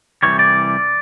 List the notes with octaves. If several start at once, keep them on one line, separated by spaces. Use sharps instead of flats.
C2 C3 E3 G3 C#5
D5